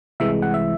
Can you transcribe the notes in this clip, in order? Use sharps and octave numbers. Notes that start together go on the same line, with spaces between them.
C2 C3 E3 G#3 E5
F#5
E5